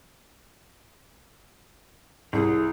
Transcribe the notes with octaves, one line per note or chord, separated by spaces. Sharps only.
C2 G#4